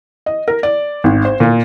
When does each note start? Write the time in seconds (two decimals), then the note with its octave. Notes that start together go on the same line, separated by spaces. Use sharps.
0.26 D#5
0.48 A#4
0.63 D5
1.04 G#1
1.25 C5
1.40 A#2